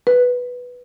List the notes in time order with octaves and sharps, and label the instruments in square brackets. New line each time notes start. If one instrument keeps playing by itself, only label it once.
[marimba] B4